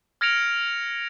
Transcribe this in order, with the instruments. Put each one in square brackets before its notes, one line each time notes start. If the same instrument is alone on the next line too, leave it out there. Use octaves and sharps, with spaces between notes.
[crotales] F6 G#6 A#6 C#7 D7 F7